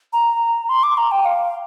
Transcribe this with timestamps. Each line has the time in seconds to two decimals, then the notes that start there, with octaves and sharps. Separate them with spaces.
0.13 A#5
0.69 C6
0.83 D6
0.97 A#5
1.11 G5
1.25 F5